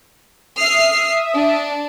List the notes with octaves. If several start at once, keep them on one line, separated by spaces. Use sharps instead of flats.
E5 D#6 F6 C7
D4